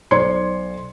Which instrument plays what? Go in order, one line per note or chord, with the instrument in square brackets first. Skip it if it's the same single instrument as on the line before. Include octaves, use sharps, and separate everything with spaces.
[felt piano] B1 C5 D5 C6 G#6 C#7